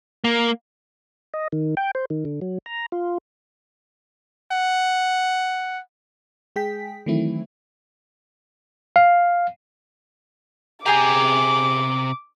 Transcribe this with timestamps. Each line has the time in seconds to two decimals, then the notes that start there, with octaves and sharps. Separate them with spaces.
0.24 A#3
1.34 D#5
1.52 D#3
1.77 G5
1.95 C5
2.10 D#3
2.25 D3
2.41 F#3
2.66 A#5
2.92 F4
4.52 F#5
6.56 G#3 G#4 G5 B6
7.06 D#3 E3 F#3 A3 C4 E4
8.96 F5
10.86 C3 G4 G#4 G#5 A#5 D6